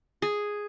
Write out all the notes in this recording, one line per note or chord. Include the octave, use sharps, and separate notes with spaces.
G#4